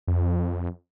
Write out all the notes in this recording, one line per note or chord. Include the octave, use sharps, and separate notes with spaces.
F2